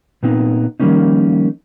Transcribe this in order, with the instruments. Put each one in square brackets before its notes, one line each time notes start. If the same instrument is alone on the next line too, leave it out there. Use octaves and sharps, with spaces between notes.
[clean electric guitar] A#2 B3 C4 D#4
D#3 F3 G3 A#3 C#4 D#4